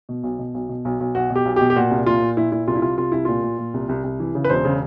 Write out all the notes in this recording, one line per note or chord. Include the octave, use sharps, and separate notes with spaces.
B2
B1
B2
B1
B2
B1
B1
B1 F#4
B2
G4
B1
B2 G4
G4
A#2 F#4
C2
A#2 F4
A#2
A#2 E4
A#2 E4
C2 F4
E4
C2 F4
C2 F4
C2 E4
A#2 F4
A#2
A#2
C2
C2
C2
E3
C#3
B4
E1 C5
C#3